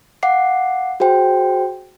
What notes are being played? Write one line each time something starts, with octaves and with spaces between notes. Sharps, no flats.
F5 F#5 D6 C7
F#4 G#4 C5 G5